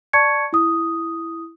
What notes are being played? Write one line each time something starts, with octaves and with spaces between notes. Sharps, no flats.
D5 A5 C#6 G#6 C#7
E4 D#6